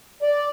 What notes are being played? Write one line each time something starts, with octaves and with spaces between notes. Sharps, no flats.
D5